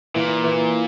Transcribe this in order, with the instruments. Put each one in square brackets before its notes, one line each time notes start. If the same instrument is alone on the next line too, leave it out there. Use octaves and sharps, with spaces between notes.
[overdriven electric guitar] A#2 [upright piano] E3
[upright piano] E3